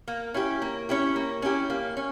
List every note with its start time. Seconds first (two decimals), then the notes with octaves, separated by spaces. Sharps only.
0.08 A#3
0.34 C#4 E4 G4
0.62 A#3
0.89 C#4 E4 G4
1.16 A#3
1.42 C#4 E4 G4
1.70 A#3
1.97 C#4